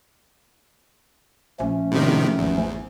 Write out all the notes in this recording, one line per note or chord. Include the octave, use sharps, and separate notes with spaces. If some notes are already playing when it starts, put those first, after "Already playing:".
A#1 F3 A3 C#4
A2 C3 D#3
G#1 E2